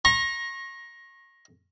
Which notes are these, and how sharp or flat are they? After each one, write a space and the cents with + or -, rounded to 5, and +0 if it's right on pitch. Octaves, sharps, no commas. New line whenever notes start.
A#5 +15 C#6 -35